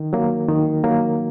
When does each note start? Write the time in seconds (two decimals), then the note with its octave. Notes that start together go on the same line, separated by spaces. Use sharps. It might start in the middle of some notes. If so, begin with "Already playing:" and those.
Already playing: D#3
0.13 F#3 A#3
0.48 D#3
0.84 F#3 A#3